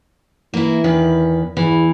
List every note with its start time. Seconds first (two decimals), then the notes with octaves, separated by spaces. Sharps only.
0.54 E3 A#3 E4
0.84 E2 D#3 B4
1.57 E2 E3